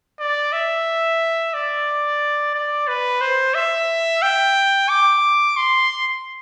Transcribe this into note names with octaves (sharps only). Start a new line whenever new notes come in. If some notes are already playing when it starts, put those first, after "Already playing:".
D5
E5
D5
D5
B4
C5
E5
G5
D6
C6